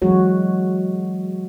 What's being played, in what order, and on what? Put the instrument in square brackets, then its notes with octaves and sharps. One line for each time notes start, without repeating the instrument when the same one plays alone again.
[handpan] E3 F#3 G#3 F#4 C#5